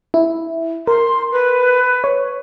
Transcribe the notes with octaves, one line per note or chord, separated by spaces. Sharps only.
E4
A#4 C6
B4
C#5